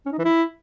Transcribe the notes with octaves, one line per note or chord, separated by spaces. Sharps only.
C#4
D#4
E3
E4